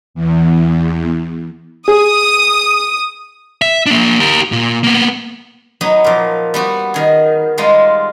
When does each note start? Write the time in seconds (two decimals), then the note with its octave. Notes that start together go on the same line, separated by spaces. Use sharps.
0.14 E2
1.88 G#4 D#6
3.62 E5
3.86 A#3 D4
4.20 G4 A#4
4.52 A#2
4.84 A#3 B3
5.81 F#3 B3 D#4 B5
6.04 A#2 F3
6.54 G3 B3 F#4
6.94 D#3 G#4
7.58 G3 G#3 D#4 F4